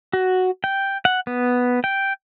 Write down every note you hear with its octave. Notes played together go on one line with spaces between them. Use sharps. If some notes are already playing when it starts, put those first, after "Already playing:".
F#4
G5
F#5
B3
G5